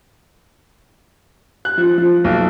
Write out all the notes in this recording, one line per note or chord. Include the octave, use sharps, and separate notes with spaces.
F#6
F3
F3
B1